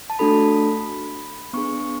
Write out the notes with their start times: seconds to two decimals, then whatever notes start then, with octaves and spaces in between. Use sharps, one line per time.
0.10 A5
0.19 A3 D4 F#4 A4 B5
1.53 B3 D4 G#4 C#6
1.74 C#6